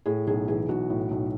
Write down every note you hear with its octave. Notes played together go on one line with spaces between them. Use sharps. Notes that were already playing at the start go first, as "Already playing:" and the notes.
A2 G#4
B1 G#4
E3 G#4
B1 F#4
A2
B1